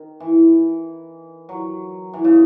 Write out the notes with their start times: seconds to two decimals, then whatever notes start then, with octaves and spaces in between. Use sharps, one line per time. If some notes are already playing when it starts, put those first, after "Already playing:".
Already playing: D#3
0.20 E3
1.49 F#3
2.13 E3
2.24 C#3